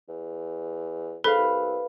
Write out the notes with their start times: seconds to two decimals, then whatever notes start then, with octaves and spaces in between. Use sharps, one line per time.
0.08 E2
1.24 G#2 A4 B4 F5
1.37 C2